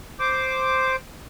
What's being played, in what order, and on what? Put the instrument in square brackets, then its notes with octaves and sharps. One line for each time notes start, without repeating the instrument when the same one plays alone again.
[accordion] C5 D6